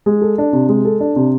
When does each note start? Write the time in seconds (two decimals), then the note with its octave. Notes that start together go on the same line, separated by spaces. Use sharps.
0.06 G#3
0.21 A4
0.38 D4
0.53 C3
0.69 G#3
0.85 A4
1.00 D4
1.16 C3